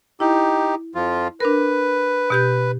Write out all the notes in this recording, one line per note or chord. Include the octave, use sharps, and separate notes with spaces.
D#4 E4 G4
F2 F3 F4
D4 A#4 B4
B2 G4 G6